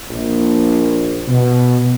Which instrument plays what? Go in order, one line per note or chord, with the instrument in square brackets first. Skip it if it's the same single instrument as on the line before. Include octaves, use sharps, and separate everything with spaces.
[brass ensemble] A#1
B2